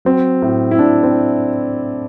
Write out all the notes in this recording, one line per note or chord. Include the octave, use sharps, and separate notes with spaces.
F#3 C4
A2
E4
A2 D4
C4